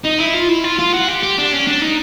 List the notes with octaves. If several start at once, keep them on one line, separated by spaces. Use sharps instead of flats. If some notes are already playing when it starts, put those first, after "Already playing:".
D#4
E4
F4
E4
F4
F4
F#4
G4
G4
D4
C#4
D4
D#4